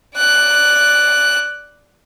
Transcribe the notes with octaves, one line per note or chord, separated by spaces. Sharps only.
D5 F#6